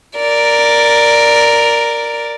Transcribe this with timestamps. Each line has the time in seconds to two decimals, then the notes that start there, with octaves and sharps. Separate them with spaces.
0.17 A#4 D5